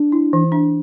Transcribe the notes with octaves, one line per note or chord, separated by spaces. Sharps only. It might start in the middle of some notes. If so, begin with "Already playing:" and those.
Already playing: D4
E4
E3
D4